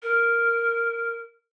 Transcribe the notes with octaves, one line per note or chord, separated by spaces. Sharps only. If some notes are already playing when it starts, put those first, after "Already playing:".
A#4